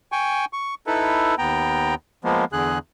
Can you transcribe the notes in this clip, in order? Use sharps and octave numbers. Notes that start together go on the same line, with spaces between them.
G5 G#5 C#6
C#6
D#4 E4 A4 B4
D#2 B3 G5 A#5
F3 G#3 A#3 B3
E2 D3 G#4 F#6